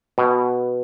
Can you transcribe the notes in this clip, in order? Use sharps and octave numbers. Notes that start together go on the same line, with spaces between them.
B2